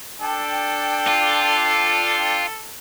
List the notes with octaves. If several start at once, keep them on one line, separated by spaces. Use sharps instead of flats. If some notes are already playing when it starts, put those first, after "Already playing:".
D4 A4 G5
F4